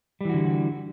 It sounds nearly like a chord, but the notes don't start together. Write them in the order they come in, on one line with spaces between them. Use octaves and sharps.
G3 E3 F#4 D3